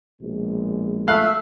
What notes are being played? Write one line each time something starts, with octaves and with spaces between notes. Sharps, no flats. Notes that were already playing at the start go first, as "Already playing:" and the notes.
A#1 B2 G#3
A3 E5 F5 E6 F#6